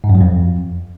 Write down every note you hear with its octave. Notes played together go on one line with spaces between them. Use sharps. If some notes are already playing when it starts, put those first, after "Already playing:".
G#2
F#2
F#3
F2